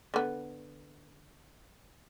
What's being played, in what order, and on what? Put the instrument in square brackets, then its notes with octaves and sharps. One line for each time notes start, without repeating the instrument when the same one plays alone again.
[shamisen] D3 B3